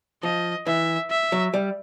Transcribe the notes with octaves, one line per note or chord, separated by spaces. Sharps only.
F3 D#5
E3 E5
E5
F#3
G3